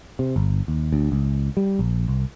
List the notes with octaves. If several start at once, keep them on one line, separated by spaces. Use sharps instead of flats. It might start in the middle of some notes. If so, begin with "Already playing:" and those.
C3
G1
D#2
D2
C#2
G3
A#1
C2